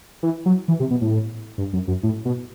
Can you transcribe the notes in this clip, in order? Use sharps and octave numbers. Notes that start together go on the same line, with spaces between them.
E3
F#3
E3
C3
B2
A2
G2
F#2
F#2
A2
B2